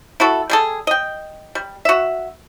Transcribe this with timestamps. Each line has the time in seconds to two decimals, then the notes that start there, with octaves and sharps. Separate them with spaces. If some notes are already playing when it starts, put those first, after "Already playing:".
0.20 E4 F#4 A4
0.50 G3 G#4 A4
0.87 D#5 G5
1.55 G3
1.85 F#4 E5